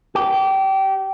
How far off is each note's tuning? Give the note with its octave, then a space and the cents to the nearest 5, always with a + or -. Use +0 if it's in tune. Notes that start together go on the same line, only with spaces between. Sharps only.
G4 -25